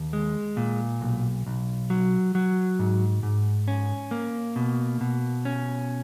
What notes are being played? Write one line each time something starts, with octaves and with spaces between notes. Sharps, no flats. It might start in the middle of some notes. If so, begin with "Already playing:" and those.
Already playing: D#2
G#3
A#2
B1
B1
F#3
F#3
G#2
G#2
C#4
A#3
B2
B2
C#4